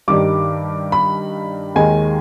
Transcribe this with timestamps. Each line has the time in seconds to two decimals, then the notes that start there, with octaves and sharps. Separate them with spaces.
0.08 G2 D#3 G3 D4 D6
0.92 B5
1.75 D#2 D#3 G#3 G#5